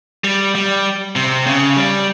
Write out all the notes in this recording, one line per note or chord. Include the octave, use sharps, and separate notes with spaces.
G3
G3
C3
C#3
G3